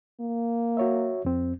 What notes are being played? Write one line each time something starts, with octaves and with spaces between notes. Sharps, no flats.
A#3
F#4 C#5 E5
F2 C4